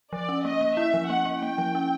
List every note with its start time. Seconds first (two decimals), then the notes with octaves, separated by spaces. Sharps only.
0.13 F3 D5
0.29 C#4
0.44 A#3 D#5
0.61 A#3
0.77 E4 E5
0.94 F3
1.10 A#3 F#5
1.25 A#3
1.42 A#3 G5
1.58 F3
1.75 C#4